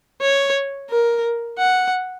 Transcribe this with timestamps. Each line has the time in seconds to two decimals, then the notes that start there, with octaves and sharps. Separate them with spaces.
0.21 C#5
0.91 A#4
1.59 F#5